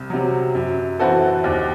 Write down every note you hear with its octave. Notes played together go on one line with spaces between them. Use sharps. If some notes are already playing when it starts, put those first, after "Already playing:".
Already playing: C2
C3 F#3
F#2
E3 C4 F#4 A4
D#2